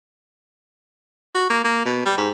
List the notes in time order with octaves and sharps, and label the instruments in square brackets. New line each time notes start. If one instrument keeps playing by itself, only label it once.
[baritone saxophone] F#4
A#3
A#3
B2
G3
G#2